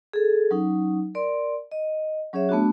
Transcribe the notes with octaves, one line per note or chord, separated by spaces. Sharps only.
G#4 A4
F#3 C#4 D#4
A#4 D5 C6
D#5
F#3 C#4 G#4 C#5 E5
A3 B3 D4 F#4